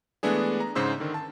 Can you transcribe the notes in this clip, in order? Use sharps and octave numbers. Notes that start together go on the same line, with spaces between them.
E3 G#3 A3 B3 D4 G#4
A#5
G#2 C#3 C5 C6 E6
D3 D#3
A5